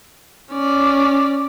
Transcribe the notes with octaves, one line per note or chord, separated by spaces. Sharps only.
C#4 D5